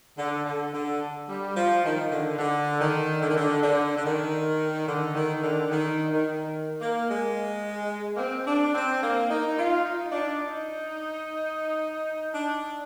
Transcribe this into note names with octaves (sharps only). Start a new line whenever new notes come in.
D3
D3
D3
G3
F3
D#3
D3
D3
D#3
D3
D#3
D3
D3
D3
D#3
D3
D#3
D3
D#3
D#3
A#3
G#3
A#3
C4
D4
C4
A#3
D#4
F4
D#4
D4
D#4
D4